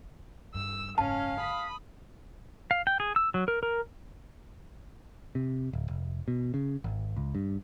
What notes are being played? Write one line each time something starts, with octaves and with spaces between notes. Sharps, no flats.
G2 E6
F#1 G#2 C#4 F5 A5
B5 D#6
F5
G5
G#4
E6
F#3
A#4
A#4
C3
D1
F1
B2
C#3
G#1
C#2
G2